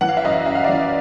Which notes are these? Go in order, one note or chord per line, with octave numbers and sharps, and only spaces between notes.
E3 F#5
F5
E5
F#2 D#5 F5
F#2 E5
F5
E3 D5 E5